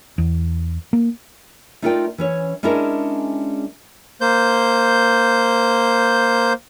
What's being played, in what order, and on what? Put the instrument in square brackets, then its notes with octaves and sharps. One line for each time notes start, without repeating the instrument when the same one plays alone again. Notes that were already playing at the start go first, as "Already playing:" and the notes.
[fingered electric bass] E2
A#3
[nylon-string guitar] A3 D#4 F4 A#4 D5 G5
E3 C#4 C#5
G#3 C#4 D4 E4 G#4 A#4
[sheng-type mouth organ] A#3 C5 G6